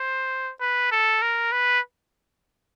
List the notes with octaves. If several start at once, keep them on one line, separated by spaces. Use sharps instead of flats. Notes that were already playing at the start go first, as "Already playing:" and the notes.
Already playing: C5
B4
A4
A#4
B4